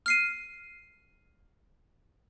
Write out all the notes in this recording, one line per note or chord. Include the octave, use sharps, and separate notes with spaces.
F6 C7 D#7